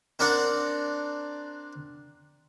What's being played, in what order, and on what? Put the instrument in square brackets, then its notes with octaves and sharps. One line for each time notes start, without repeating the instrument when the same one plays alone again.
[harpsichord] C4 D4 A#4 D5 F#5